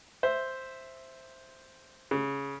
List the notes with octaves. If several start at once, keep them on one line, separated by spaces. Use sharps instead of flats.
C5 E5
C#3